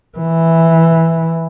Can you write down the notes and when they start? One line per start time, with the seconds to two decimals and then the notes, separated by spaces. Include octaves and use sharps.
0.18 E3